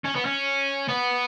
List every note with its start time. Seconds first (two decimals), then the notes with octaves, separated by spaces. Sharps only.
0.04 C#4
0.15 B3
0.25 C#4
0.89 B3